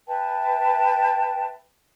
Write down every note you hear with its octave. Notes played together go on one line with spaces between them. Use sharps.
B4 E5 G5 A5